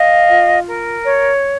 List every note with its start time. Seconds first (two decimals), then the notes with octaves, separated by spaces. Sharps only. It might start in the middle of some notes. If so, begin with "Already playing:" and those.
Already playing: D#5 F5
0.28 F4
0.66 A#4
1.05 C#5